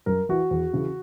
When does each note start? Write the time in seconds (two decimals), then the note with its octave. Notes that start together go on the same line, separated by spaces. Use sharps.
0.06 F#2 A#4
0.29 E3 F#4
0.51 E2
0.74 C#3 E3